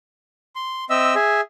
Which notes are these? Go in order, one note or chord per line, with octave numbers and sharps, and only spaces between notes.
C6
C4 D#5 E5 E6
G#4 E5